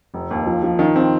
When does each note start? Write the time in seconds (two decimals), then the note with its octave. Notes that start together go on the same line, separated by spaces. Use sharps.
0.14 F1
0.31 D#2
0.46 F3
0.63 F3
0.79 D#3
0.96 C4